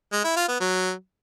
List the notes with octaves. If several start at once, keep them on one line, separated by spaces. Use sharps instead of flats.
G#3
E4
F4
B3
F#3